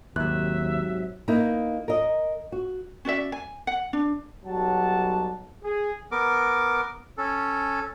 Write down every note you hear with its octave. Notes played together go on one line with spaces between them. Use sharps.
D#2 G#2 C3 F#3 E5 F#6
A#3 B3 D#4 E4
A#4 D#5
F#4
C#4 F#4 D5 E5
G#5
F#5
D4
B1 F#3 G3 F#5 A5
G#4
B3 A#4 D6
C#4 A4